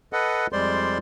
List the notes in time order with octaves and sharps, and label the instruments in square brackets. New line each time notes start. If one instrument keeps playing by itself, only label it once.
[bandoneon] A4 B4 D#5 F#5
F2 G3 G#3 C5 D5 C6